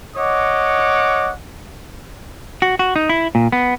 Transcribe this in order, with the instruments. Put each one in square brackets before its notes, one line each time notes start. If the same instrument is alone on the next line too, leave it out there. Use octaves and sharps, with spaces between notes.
[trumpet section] C#5 D#5 F#5 D6
[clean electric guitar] F#4
F#4
D#4
E4
A#2
B3